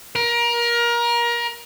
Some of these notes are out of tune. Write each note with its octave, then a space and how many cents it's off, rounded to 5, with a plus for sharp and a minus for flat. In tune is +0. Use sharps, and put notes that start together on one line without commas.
A#4 +25